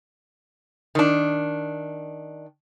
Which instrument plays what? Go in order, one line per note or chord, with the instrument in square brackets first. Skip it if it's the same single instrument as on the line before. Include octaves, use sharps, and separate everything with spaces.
[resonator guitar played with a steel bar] D#3 D4